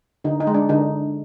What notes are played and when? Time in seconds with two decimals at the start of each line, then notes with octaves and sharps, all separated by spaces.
0.24 D3 D#4
0.40 D#4
0.47 G#3
0.54 D4
0.69 D3 D#4